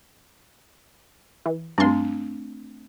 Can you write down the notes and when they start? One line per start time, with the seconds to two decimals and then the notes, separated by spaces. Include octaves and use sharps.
1.46 E3
1.78 G2 A3 C4 D4 C6